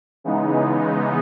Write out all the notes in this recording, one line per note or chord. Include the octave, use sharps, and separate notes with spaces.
C#3 E3 G#3 B3 D#4